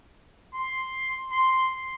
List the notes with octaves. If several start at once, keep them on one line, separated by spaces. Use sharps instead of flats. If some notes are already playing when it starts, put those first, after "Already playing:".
C6
C6